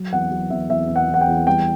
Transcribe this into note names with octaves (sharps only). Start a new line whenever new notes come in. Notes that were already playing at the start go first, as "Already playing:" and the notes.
Already playing: F#3
E2 F#5
F#3
E2 E5
E2 E5
E2
F#5
E2
F#5
G5
E2
G3 G5